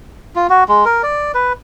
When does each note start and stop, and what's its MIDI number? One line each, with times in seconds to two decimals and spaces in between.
0.36 0.47 65
0.49 0.64 66
0.68 0.85 56
0.85 1.02 70
1.03 1.32 74
1.34 1.53 71